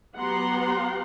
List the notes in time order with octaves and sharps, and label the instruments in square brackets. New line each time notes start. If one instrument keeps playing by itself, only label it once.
[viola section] F#3 B3 G4 F#5 A#5 C6